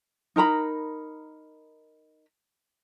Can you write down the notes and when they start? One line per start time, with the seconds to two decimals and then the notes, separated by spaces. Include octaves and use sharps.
0.36 D#4 A#4 A#5 B5